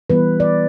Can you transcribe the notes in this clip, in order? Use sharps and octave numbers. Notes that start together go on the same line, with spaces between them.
E3 G3 B3 B4
D5